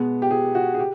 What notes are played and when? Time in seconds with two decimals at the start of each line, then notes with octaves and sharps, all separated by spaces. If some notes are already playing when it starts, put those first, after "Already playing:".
Already playing: B2 G#3 B3
0.22 G4
0.31 G#4
0.55 F#4
0.75 G#4
0.79 G4